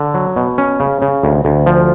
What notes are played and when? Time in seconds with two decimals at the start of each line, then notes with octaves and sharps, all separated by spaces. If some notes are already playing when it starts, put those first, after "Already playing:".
Already playing: D3
0.14 F#3
0.36 B2
0.58 C#4
0.80 C#3
1.02 C#3
1.23 D2
1.45 D2
1.66 F3